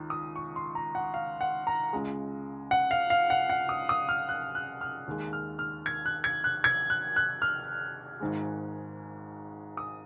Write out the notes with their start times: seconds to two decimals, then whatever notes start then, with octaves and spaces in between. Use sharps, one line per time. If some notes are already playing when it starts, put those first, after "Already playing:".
Already playing: C#2 D#3
0.10 D#6
0.36 C#6
0.56 C6
0.75 A#5
0.95 F#5
1.14 F5
1.41 F#5
1.67 A#5
1.93 C#2 C#3 G#3
2.71 F#5
2.91 F5
3.10 F5
3.30 F#5
3.50 F#5
3.69 D#6
3.89 D#6
4.09 F6
4.29 F#6
4.55 F#6
4.81 F6
5.07 D#2 D#3 G#3
5.33 F6
5.59 F6
5.86 G#6
6.06 F#6
6.24 G#6
6.44 F#6
6.64 G#6
6.90 F#6
7.16 F#6
7.42 F6
8.20 G#1 G#2 D#3 G#3
9.77 D#6